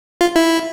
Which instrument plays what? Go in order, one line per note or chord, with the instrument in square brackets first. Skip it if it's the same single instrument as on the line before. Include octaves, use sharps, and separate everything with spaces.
[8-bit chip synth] F4
E4